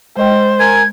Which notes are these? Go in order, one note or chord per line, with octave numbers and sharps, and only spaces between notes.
G#3 C5 D#5 G5
A#4 G#5 G#6